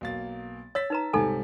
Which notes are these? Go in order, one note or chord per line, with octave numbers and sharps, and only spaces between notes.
B1 A#3 A6
C#5 E6 A6 B6
D#4 B4 A#5
C2 G#2 C3 D#4 A4 G#5